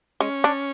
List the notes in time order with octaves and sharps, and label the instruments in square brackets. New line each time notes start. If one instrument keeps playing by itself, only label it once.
[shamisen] G#3 [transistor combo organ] C#4
[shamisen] D4